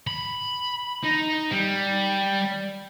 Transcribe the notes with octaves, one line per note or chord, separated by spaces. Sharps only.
B5
D#4
G3